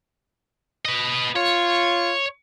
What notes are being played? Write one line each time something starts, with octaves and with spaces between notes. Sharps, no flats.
B4 D#5
F4 C#5